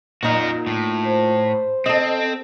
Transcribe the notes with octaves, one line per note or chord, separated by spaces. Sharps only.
A#2 D#4 F#4 A#4
A2
C5
C4 A4 D#5